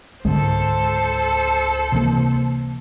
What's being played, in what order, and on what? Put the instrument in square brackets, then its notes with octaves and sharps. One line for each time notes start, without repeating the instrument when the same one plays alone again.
[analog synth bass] C#2 [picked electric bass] G#2 D3 G#3 [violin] A4 C5
[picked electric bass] C3 E3 A#3